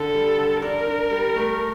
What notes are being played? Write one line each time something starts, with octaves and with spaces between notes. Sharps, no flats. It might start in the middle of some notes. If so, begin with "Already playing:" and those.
Already playing: D3 A4
G3
D3
D4 A#4
D4
G3
A3